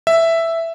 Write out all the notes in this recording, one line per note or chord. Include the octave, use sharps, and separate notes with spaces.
E5